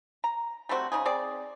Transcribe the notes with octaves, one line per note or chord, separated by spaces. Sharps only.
A#5
G3 A3 C4 F#4
C#3 D#4 G#4
C4 G#4 D5